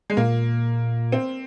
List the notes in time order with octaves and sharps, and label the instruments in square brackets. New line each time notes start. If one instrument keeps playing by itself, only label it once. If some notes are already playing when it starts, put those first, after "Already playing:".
[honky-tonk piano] G#3
[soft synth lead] A#2 [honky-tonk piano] A#3
[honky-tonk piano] C4